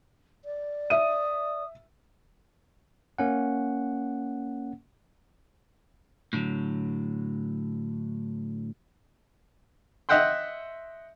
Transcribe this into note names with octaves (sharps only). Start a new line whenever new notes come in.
D5
E5 D#6 D#7
A#3 C#4 F#5
A2 D3 E3 F#3
D#5 E5 F#5 G5 C6